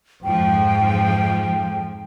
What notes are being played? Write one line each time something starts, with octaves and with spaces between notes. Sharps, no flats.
F2 G#2 F3 G5